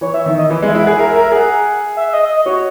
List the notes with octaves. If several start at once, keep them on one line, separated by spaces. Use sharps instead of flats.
E3 C#5
E5
D#3 E5
D#5
E3
G#3
E5
E4
G#4 F#5
A#4 E5
E5
A#4
E5
G#4 F#5
E5
E5
D#5
D#5
F#4 C#5